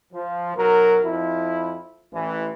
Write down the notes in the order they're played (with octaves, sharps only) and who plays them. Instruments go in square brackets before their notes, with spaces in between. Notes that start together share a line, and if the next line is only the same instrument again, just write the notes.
[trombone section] F3
B1 F#3 A#4
F2 F3 E4
A1 E3